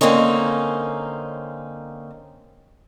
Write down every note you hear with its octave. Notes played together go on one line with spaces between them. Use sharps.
D3 A#3 C4 C#4 D#4